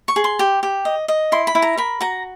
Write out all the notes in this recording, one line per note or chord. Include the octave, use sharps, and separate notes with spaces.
C#6
G#4
C6
G4
G4
D#5
D#5
E4 C6
B5
E4
A#5
A#4 B5
F#4 A#5